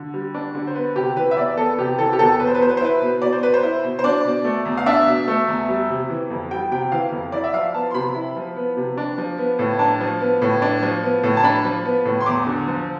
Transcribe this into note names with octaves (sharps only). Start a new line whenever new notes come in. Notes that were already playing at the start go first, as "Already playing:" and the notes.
Already playing: D3
G3
D4
D3
C5
B3 B4
C3 G4
E3 B4
E5
E2 D5
B3 A4
C3 G4
E3 A4
G4
E2 A4
B2 B4
C5
B4
B3 C5
B4
C5
E4 B4
B2
B2 D5
C5
B3 B4
C5
E4
B2
C5
D4 D5
B2
A3
E2
F5
D4 E5
B2
A3
E2
G3
C3
E3
F2
G3 G5
C3 G5
E3 F5
F2
E4 D5
E5
F3 F5
B3 A5
C6
C3 B5
E4
F3
B3
C3
D4
F3
B3
A2
D4 A5
F3
B3
A2
D4
F3
B3
A2
A5
D4 B5
F3
B3
A2
C6
E2 D6
D3
F3